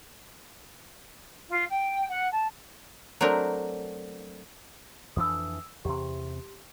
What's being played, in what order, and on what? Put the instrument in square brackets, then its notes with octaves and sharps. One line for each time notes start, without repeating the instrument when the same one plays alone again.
[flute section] F4
G5
F#5
A5
[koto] F#3 A3 C4 D4 A#4
[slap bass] F2 E3 D4 [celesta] D#6 E6
[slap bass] E2 C3 [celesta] G4 C6